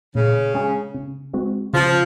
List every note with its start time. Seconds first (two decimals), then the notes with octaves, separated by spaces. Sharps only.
0.15 A#2 C#3
0.54 G#3 C#4 G#4
0.94 C#3
1.33 G#3 C4 F#4
1.73 C#3 F3